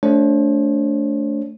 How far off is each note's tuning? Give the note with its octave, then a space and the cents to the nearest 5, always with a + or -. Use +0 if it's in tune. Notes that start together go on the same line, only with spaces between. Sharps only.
A3 -5 D4 -30 C5 +40